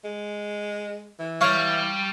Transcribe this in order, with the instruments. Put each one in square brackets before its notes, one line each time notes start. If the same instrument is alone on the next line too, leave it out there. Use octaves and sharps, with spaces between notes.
[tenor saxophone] G#3
E3
[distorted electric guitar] G3 [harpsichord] C#5 F5